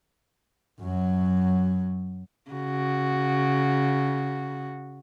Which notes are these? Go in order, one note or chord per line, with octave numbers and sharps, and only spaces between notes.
F#2 F#3
C#3 F#4